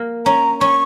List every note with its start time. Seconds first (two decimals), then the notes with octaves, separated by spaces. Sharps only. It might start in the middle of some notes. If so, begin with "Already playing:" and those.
Already playing: A#3
0.25 C#4 A#5
0.61 C#4 C#6